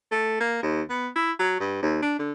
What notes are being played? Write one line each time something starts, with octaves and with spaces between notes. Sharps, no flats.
A3
A#3
D#2
B3
E4
F#3
G2
D#2
D4
D3